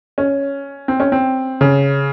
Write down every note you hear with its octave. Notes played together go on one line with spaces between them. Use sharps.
C#4
C4
C#4
C4
C#3